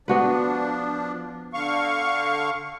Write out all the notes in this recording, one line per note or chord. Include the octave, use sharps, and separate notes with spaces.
F3 B3 D4 F#4 B4
D3 F5 C#6